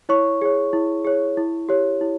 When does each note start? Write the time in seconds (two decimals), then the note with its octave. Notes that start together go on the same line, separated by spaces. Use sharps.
0.09 E4 C#5 C#6
0.42 G#4 C#5
0.73 E4
1.05 G#4 C#5
1.37 E4
1.69 G4 C#5
2.01 E4